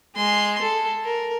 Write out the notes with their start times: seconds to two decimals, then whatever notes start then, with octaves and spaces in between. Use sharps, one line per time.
0.16 G#3 C6
0.62 A4
1.05 A#4